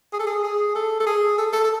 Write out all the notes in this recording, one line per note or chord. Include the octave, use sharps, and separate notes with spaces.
G#4
A4
G#4
G#4
A4
A4
G#4
A4
A4
A4